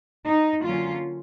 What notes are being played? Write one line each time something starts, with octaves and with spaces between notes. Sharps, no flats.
D#4
D3 F#3 A#3 C#4 F4